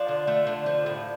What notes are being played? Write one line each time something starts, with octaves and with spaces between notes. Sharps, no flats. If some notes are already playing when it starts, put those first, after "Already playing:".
Already playing: F3 D4 F4
D3
A3
D3
F3
A2